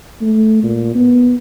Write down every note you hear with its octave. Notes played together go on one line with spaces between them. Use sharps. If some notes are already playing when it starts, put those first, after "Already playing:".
A3
A#2
B3